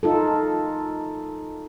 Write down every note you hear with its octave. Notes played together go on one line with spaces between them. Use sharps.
D#4 F4 A4